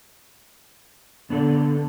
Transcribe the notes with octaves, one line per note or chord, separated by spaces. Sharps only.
D3 B3 D4 A4